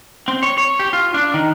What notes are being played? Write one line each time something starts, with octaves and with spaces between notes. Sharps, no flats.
C4
C#5
C#5
G4
F4
D4
D#3